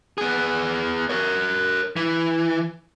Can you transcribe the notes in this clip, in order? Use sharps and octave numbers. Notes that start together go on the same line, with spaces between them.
B3 G#4
A#4 C#5
E3